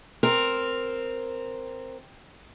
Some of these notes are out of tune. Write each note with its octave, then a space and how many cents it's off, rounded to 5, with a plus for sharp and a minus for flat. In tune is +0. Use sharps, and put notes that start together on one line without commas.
C4 +0 A#4 +0